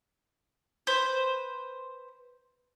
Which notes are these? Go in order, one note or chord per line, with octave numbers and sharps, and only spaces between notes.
B4 C5